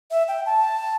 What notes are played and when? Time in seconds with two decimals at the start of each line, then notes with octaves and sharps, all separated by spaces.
0.11 E5
0.28 G5
0.46 A5